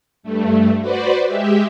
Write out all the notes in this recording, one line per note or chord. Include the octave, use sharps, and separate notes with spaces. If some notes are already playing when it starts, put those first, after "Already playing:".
G2 A3
F#4 B4 C5 D5
G#3 G4 E5